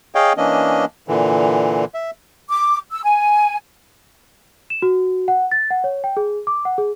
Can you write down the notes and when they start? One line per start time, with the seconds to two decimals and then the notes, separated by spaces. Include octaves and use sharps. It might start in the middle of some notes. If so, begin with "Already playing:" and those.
0.15 G#4 C#5 D#5 F5 G5
0.37 E3 A#3 C#4 D4 D#5
1.08 A#2 D3 E3
1.94 E5
2.49 D6
2.90 E6
3.03 G#5
4.70 E7
4.82 F#4
5.28 F#5
5.52 A6
5.70 F#5
5.84 C#5
6.04 G5
6.17 G#4
6.47 D6
6.65 F#5
6.78 G#4